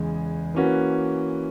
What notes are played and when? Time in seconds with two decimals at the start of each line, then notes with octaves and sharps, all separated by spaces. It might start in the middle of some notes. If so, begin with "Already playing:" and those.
Already playing: E2 C#3 G#3
0.54 E3 A#3 C#4 F#4 B4